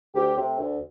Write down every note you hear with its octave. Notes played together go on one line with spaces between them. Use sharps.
D2 G4
C3 A3 C4
D2